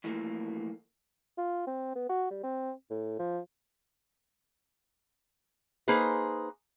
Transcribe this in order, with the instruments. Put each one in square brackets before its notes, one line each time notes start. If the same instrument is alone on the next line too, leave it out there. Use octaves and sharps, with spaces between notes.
[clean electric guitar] F#2 E3 F3 A3 A#3
[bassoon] F4
C4
B3
F#4
G3
C4
A2
F3
[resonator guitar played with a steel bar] A#3 D#4 G#4 B4 C5